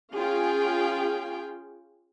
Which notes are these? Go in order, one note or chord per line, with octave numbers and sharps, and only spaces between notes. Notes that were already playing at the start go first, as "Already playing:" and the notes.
C#4 F4 G#4 F5 G5 G#5